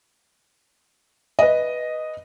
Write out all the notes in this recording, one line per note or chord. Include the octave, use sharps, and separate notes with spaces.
B4 D#5